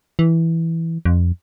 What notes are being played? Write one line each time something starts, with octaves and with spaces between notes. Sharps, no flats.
E3
F2